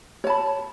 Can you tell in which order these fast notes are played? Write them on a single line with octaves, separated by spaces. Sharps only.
C#5 A5 B5